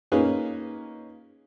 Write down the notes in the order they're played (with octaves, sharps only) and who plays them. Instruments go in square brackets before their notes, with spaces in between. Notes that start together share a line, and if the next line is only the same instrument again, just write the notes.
[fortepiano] A#3 C#4 D#4 F4 G#4 B4